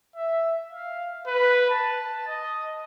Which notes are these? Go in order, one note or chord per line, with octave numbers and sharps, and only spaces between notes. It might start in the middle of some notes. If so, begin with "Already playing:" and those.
E5
F5
B4
A5
D#5